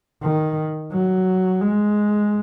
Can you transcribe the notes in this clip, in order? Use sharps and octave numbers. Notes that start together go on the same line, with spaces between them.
D#3
F#3
G#3